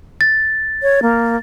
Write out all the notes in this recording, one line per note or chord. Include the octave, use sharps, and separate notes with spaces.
A6
C#5
A#3